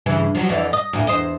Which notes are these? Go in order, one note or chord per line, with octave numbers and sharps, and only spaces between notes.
G2 C#3 E3
F3 F#3
F2 D3 E3
D#5
D2 A2 A#3
E2 C5 D#5